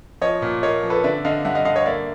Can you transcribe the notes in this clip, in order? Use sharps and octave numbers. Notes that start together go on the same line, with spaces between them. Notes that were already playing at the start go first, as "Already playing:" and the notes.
F3 C#5 D#5
A#2
A#3 C#5 D#5
F3
A4 B4
D3 D5 E5
D3 D#5 F5
G2 E5 F#5
D#5 F5
D3 D#5 F5
C#5 D#5
A#3 D5 E5